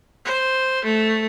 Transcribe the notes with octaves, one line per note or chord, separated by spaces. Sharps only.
C5
A3